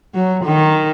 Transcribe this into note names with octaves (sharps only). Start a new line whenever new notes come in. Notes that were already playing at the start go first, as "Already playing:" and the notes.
F#3
D#3